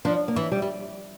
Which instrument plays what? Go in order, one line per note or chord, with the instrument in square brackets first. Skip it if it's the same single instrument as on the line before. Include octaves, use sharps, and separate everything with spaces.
[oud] F3 [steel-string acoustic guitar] D4
[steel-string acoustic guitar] A#3
[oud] E3
[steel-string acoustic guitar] G3
[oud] G3